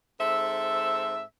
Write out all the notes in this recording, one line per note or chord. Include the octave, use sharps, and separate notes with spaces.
G#2 C4 A4 E5